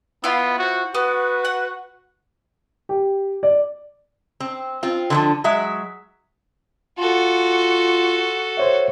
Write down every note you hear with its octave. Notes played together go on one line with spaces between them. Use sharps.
B3 E4 F4 F5
F#4 C5
B3 F#4 B4
F#5
G4
D5
C4
C4 F4
D3 E3 F3
F#3 G#3 E5
F4 F#4 A4
C5 C#5 E5